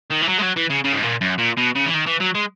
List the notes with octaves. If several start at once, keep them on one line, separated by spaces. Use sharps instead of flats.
D#3
E3
F#3
G#3
F#3
E3
C#3
C#3
G#2
A#2
F#2
A#2
B2
C#3
E3
D#3
E3
F#3
G#3